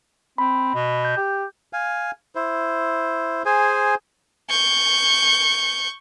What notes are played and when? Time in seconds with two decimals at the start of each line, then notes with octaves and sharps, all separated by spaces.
0.38 C4 B5
0.75 B2
1.05 G6
1.17 G4
1.73 F5 G#5
2.35 E4 C5
3.45 G#4 C5 G#5
4.50 C#6 G6